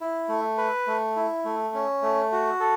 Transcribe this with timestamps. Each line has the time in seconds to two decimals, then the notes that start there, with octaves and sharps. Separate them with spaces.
0.01 E4
0.29 A3
0.58 B4
0.87 A3
1.16 E4
1.45 A3
1.74 C#4
2.02 A3
2.32 F#4
2.60 A4